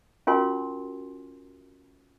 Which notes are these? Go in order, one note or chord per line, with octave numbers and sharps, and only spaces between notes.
C#4 F4 F#4 A#4 G#5 C6